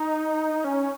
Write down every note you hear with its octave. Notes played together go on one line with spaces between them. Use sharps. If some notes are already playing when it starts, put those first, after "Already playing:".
Already playing: D#4
C#4